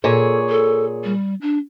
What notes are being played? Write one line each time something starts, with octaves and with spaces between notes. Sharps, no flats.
A#2 G#4 A4 C#5
A4
G3
D4